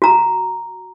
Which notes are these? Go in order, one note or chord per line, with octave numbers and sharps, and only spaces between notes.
F#4 A#5